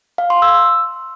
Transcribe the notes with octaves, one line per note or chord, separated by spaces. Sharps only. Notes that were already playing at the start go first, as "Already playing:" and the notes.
F5
C6
E6